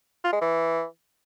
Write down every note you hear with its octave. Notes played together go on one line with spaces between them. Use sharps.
F4
G#3
E3